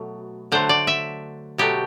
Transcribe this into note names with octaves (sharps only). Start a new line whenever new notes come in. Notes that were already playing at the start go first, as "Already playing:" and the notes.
Already playing: B2 F#3 A3
D3 F#3 A3 C5
D5
E5
B2 F#3 A3 G4